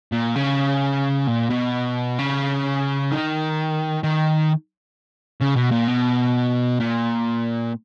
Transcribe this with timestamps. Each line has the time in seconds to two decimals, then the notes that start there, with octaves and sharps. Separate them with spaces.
0.12 A#2
0.35 C#3
1.27 A#2
1.50 B2
2.19 C#3
3.11 D#3
4.04 D#3
5.41 C#3
5.57 B2
5.72 A#2
5.88 B2
6.80 A#2